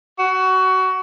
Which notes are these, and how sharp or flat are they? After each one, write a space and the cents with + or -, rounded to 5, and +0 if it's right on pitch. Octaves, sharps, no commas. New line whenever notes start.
F#4 +20